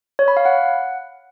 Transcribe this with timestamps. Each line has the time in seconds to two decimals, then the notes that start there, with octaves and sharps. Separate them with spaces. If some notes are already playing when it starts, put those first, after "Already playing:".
0.19 C#5
0.28 B5
0.37 F5
0.45 F#5